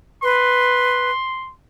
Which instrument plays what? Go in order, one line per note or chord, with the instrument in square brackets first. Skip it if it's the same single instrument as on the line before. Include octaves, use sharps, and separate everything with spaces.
[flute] B4 [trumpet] C6